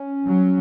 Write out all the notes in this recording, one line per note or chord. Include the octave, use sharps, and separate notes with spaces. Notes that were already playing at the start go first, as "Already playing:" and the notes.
Already playing: C#4
F#3